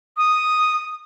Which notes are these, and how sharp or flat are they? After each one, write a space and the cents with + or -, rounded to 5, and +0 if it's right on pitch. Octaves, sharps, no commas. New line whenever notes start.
D#6 +0